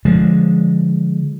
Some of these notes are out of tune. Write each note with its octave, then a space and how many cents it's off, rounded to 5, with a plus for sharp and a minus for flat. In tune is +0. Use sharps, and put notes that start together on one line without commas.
D3 +0 F3 +0 G#3 +0